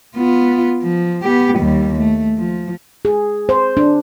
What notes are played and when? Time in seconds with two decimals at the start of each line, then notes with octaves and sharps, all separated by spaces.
0.16 B3 F4
0.83 F3
1.23 B3 G4
1.58 D#2 G3
1.99 A3
2.38 F3
3.05 G#4
3.49 C5
3.77 D4